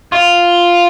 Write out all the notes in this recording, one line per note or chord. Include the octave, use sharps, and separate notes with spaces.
F4